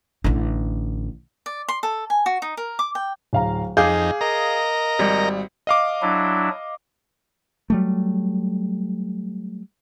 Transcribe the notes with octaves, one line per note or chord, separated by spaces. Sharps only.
A1 D3
D5
C6
A4
G#5
F#4
D#4
A#4
D6
G5
D1 F5 A#5
F2 D#4 G#4 F5 D6 G6
A#4 D#5 A#5
G#1 G3
D#5 F5 D6
F#3 D4 E4
F#3 G3 A3